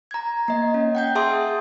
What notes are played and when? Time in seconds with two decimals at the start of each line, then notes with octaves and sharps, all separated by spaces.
0.11 A#5 G#6
0.48 A#3 D#5
0.74 C#4
0.95 F#5 G5 G6
1.15 G#4 E5 A5 C6 D#6